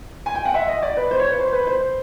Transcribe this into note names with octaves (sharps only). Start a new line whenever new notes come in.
G#5
G5
F#5
E5
D#5
D5
B4
C5
C#5
B4
C5
B4
C5